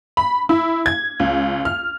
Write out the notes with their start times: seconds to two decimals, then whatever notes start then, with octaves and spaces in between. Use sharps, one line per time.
0.17 B5
0.49 E4
0.86 G#6
1.20 C#2
1.65 F6